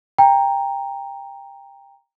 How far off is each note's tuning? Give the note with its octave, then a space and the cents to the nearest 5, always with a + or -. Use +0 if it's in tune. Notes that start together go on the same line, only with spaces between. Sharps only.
G5 +20 A#5 +0